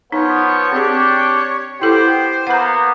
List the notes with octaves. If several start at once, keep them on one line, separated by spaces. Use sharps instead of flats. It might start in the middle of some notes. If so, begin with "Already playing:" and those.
F3 B3 D#4 C#5
C4 D4 G4 G#4
B3 E4 G4 A4 C5
A#3 B3 F#5 A#5